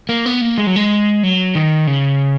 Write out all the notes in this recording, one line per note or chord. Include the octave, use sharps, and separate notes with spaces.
A#3
B3
A#3
G#3
F#3
G#3
F#3
D#3
C#3